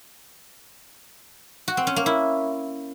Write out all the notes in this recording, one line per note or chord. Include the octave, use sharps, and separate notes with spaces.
F#4
C4
C#4
A#3
E4